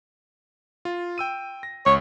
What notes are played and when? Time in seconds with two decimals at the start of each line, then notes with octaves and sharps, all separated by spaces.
0.85 F4
1.18 G5 E6 D#7
1.63 A#6
1.86 C#2 C#5